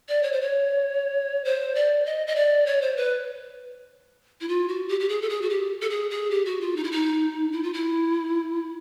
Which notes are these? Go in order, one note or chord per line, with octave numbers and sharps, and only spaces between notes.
D5
C#5
C5
C#5
C5
D5
D#5
D#5
D5
C#5
C5
B4
E4
F4
F#4
G4
G4
G#4
A4
G#4
F#4
G4
A4
G#4
G#4
G4
F#4
F4
D#4
E4
D#4
E4
F4
E4